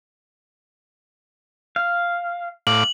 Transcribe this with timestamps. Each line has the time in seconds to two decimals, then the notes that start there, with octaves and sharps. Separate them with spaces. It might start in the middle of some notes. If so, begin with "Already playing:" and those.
1.76 F5
2.67 A2 F5 D6 F#7